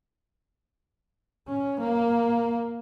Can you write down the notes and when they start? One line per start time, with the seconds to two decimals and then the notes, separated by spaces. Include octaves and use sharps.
1.48 C#4
1.80 A#3